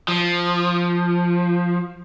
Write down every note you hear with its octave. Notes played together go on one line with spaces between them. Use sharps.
F3